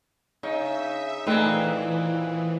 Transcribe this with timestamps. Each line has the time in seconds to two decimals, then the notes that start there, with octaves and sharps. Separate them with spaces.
0.43 C#3 D#4 E5
1.27 A#2 E3 A3 C4 D#4 G#4 B4